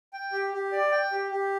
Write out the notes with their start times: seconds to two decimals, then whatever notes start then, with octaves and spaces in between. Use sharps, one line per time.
0.13 G5
0.32 G4
0.53 G4
0.72 D5
0.91 G5
1.12 G4
1.31 G4